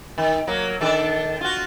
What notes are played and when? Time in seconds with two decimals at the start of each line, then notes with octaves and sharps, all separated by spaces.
0.18 D#3
0.47 F#3 A#3
0.81 D#3 D4 A4
1.41 F4 F#4